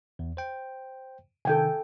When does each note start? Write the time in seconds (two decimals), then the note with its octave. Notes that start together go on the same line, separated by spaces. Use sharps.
0.19 E2
0.37 C5 G5
1.45 C3 D#3 A4 G5 G#5